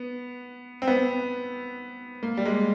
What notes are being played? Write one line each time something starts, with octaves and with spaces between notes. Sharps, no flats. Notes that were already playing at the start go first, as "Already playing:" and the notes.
Already playing: B3
C4
B3
A#3
G3
G#3